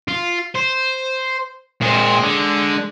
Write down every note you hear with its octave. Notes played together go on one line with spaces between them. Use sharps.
F4
C5
A#2 G#3 C4
D3